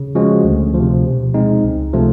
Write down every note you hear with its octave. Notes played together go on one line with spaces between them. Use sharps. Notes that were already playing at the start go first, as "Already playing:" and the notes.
Already playing: C#3
F3 G#3 C#4 F#4
D2
F3
C3
B2
G#3 C4 D#4
C#2
C3 F3 A3